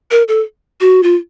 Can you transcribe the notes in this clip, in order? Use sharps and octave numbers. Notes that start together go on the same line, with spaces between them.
A#4
A4
F#4
F4